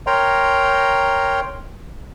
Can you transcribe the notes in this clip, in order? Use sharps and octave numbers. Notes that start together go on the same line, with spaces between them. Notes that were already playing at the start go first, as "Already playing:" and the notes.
A#4 C#5 G5 A#5 C6